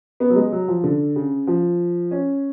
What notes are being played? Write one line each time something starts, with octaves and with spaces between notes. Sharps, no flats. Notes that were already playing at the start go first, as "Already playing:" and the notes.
B3
F#3
G#3
F#3
F3
D3
C#3
F3
C#4